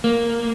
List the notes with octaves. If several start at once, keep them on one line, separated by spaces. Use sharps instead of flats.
A#3